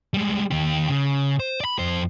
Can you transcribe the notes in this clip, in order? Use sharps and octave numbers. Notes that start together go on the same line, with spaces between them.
G3 G#3
D#3 G4
C#3
C5
D5 B5
F2 C5